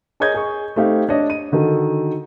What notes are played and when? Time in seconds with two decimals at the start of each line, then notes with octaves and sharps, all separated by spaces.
0.20 G#4 A#4 C#5 D#5 G6 G#6
0.34 G#4 C#6
0.76 A3 C4 D#4 G4 F5
1.09 D4 C#5 D#5
1.30 D#7
1.52 D3 D#3 F#4 A4